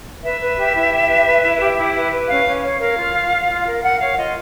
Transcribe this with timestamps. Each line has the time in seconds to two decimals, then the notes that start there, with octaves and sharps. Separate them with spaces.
0.24 B4 E5
0.41 B4
0.58 G4
0.75 E4
0.92 G4
1.09 B4
1.26 B4
1.43 E4
1.61 G4
1.78 E4
1.95 B4
2.12 B4
2.29 C#4 F5
2.46 C#4
2.63 C#5
2.80 A#4 F5
2.97 F4
3.14 F4
3.32 F4
3.49 F4
3.66 A#4
3.83 A#4 F#5
4.00 C#5 F5
4.17 F4 D#5